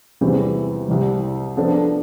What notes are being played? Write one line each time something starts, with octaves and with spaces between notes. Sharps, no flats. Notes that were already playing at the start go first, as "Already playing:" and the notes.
E2 C3 E3 G3
C2 C3 G3
F3 B3 D4 A4 D5